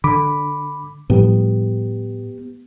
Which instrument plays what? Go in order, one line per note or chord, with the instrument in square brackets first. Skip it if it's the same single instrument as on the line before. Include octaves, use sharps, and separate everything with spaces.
[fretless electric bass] D3 [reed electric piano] B5 D6
[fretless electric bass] A2 F3 G3 [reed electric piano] B3 G4